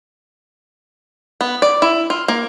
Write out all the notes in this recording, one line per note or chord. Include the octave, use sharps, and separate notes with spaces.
B3
D5
E4
F4
A#3